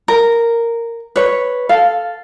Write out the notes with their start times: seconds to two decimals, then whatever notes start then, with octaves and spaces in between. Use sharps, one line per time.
0.08 A#4
1.16 B4 C#5
1.69 A4 F5